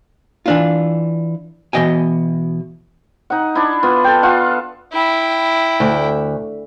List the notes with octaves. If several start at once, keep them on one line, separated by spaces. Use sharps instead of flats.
E3 D4 F4
B2 E3 D#5 G5 G#5
D#4 F#5
D4 E4
B3 F4
A4 G5
F4 F5 F#5
E4 G5
D2